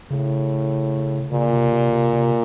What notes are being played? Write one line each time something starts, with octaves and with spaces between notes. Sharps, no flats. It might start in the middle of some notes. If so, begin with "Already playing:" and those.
A2 C#3
A#2 C#3
C3
C3
C3
C3